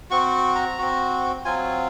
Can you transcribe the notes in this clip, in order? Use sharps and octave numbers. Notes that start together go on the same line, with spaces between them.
C4 F#4 C#6
A#5
C4 F#4
F#3 C4 F4 G#5